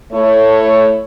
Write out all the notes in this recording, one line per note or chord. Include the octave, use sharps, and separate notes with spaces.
A3 E4 C#5